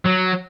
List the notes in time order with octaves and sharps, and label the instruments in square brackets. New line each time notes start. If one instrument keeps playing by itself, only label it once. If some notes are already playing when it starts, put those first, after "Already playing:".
[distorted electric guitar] F#3